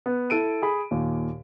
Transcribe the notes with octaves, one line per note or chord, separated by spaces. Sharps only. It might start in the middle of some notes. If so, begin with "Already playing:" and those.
B3
E4 A4 D7 D#7
G#4 B5
D#2 A#2